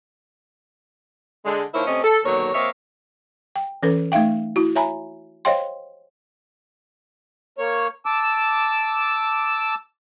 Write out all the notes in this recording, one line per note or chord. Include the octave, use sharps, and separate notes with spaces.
D3 G#3
D#3 F3 A#3 E4 C5 C#5
C3 A3 C4 C#4 D#5
A4
D#2 B2 D3 F#3 A#4 C#5
F3 A#3 C4 C#5 D#5 E5
G5
E3 C#4 A4 B4
A3 D#4 E5 F5 G5
E4 F#4
C#5 E5 G#5 A#5 B5
C5 C#5 D#5 F5 G5 C6
A#3 C#5
A5 D6 E6